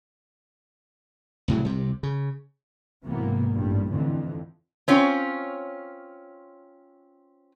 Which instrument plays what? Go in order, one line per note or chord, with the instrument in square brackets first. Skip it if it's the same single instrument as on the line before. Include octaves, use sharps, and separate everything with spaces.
[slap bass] C2 A2 C#3 F#3
C2 C3
C#3
[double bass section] B1 G#2 C3 E3 A#3 B3
A1 G2 A#2 G3
F2 D3 E3
[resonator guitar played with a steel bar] C4 C#4 F4 C#5